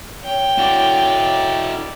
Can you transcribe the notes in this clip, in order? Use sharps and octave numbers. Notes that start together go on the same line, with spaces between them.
C#5 G5
E4 F#4 A4 D5